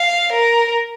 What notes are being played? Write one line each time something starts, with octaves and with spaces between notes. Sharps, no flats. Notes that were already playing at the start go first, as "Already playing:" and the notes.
Already playing: F5
A#4